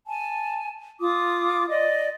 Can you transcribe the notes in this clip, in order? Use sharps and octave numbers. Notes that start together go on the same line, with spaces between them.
G#5 A5
F4 D6 D#6
D5 D#5